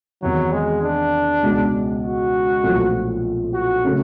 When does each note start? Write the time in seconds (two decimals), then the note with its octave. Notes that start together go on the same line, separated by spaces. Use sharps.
0.22 E2 C3 D#3 F#3
0.52 G#3
0.82 D4
1.43 C#2 B2 G#3
2.03 F#4
2.63 B1 A#2 F3 A3 C4
3.54 F#4
3.84 C#3 F#3 A3 C#4